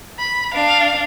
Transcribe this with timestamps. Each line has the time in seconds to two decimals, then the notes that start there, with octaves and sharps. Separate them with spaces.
0.19 B5
0.54 D4 F5